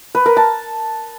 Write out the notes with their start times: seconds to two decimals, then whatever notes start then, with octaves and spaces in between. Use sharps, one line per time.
0.15 B4
0.26 A#4
0.37 A5